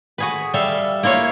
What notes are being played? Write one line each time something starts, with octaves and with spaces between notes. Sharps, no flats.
F#4 G#4 B4
G3 A4 E5 F5
A#3 E4 F4 C#5